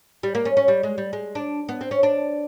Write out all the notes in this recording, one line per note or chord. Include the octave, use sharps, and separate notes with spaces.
G3
A#3
C#4
C#4
G3
G#3
G3
G#3
D4
B3
C4
C#4
D4